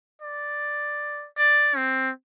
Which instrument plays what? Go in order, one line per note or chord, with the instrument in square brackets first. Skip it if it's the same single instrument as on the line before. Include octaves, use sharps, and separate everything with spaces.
[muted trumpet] D5
D5
C4